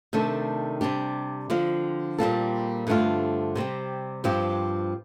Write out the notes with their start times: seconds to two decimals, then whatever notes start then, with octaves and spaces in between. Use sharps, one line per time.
0.13 C3 D#3 A3 D4 A4
0.81 C3 G3 D4 G4
1.50 D3 F3 C4 F4
2.18 A#2 G3 C4 F4 A4
2.87 G2 D3 A3 C4 F4
3.55 C3 G3 C4 G4
4.24 G2 F3 C4 G4